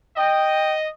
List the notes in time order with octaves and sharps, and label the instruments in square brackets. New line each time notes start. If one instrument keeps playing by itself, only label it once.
[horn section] D#5 [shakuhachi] G5